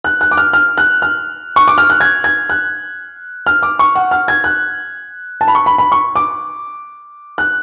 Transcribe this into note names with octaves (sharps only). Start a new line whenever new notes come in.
F#6
F#6
D6
F6
F6
F#6
F6
C#6
D6
F6
F#6
G#6
G#6
F#6
F6
D6
C#6
F#5
F6
G#6
F#6
A5
B5
C#6
B5
B5
C#6
D6
F#6